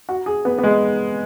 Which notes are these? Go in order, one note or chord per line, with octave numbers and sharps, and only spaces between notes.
F#4
G#4
B3
B3
G#3